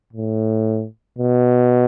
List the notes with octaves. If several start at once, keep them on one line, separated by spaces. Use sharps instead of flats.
A2
B2